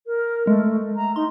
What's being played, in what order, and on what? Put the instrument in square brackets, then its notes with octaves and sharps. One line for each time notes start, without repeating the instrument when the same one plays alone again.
[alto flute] A#4
[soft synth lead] G#3 [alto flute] A3
[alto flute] A#5
[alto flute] D#4 [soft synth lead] C6